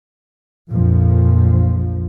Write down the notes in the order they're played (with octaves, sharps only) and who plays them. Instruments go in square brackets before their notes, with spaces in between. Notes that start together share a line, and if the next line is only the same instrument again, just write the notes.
[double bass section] A#1 F2 F3